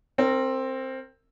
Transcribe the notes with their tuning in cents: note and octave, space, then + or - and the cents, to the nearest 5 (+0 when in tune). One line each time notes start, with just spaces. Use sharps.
C4 +10 A#4 -25